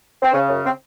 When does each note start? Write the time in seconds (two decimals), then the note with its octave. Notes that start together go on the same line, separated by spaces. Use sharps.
0.23 C4
0.33 C#3 C#4
0.48 F#2 C#4
0.65 C4